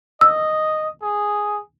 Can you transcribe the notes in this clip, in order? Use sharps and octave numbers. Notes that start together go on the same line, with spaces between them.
D#5 E6
G#4